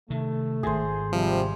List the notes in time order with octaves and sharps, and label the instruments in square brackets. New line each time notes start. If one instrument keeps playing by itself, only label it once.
[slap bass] C3 D#3 [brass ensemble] A3
[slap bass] G#1 G#2 [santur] G#4 C5
[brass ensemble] C3 G3 [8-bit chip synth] F3